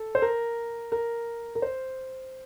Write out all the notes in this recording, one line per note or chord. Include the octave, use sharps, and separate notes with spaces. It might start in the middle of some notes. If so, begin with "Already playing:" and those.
Already playing: A4
C5
A#4
A#4
A#4
C5